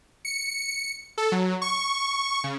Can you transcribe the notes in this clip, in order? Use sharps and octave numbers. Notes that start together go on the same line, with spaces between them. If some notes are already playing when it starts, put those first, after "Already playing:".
C#7
A4
F#3
C#6
C#3